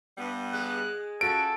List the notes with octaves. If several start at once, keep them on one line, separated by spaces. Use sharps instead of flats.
G2 G3 B3
G#3 F#6
C#4 F4 F#4 A4 D7